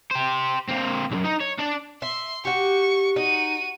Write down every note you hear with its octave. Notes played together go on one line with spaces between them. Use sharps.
G4 C5
A#3 C4
B1 F#2
D#4
C#5
D4 D5
E5 C6
F#4 G4 C#6
D#4 F#4 D#7